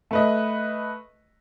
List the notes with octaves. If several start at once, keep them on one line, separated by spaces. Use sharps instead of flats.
A3 B4 D#5